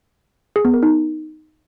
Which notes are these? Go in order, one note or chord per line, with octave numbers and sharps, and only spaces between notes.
G#4
B3
A#4
D#4